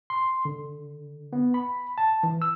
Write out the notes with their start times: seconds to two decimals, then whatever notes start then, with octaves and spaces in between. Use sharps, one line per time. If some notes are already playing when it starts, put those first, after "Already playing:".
0.10 C6
0.45 D3
1.33 B3
1.54 B5
1.98 A5
2.23 E3
2.42 E6